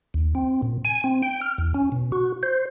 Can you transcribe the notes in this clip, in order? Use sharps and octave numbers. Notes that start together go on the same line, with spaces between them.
D#2
C4
A#2
G#5
C4
G5
F6
E2
C#4
B2
F#4
C5